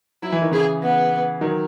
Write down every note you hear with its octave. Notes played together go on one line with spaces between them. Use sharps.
F#3 E4
E3
D#3
C#3 E3 G#4
B3
D#3 F#3